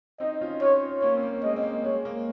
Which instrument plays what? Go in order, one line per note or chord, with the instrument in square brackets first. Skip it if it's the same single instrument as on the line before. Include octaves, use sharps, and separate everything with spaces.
[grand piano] C4 D#4 [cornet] D#5
[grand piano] C#4 F4
[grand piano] C#4 F4 [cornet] C#5
[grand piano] A#3 C#4 [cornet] C#5
[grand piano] C4
A#3
[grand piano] G#3 [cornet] D#5
[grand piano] C4
A#3
[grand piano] G#3 [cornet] C#5
[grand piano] A#3